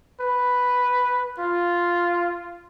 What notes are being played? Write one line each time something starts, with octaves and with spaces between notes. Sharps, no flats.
B4
F4